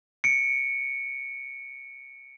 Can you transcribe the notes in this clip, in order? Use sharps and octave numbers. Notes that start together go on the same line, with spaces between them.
C#7 D7